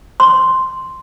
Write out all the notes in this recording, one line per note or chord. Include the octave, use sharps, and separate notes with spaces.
C6